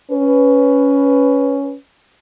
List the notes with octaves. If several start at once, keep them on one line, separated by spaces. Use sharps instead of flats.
C#4 B4